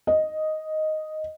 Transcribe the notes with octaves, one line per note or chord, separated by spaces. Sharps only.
D#5